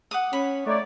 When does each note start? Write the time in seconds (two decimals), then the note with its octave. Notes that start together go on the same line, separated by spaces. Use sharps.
0.11 F#5 D6 D#6
0.33 C#4 B5
0.66 A3 D#4 C#5 D5